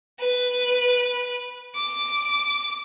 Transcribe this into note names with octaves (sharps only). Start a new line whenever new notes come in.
B4
D6